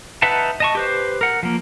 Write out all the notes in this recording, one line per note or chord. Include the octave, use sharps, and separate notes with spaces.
D#4 B4 E5 F#5 A5
D#5 A5 C#6
G4 B4 C5
A#4 F#5
F3 A#3